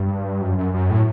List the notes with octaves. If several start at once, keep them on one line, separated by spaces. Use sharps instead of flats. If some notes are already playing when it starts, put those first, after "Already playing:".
Already playing: G2
F#2
F#2
F#2
A2